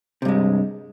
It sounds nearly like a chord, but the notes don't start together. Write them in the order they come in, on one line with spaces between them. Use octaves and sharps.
C3 G2 G#3